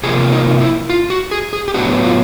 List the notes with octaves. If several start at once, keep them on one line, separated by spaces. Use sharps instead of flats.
C3 F3 A#3 G#4
D#4
E4
F4
F#4
G#4
G#4
G4
A2 F#3 B3 D4 F#4
F4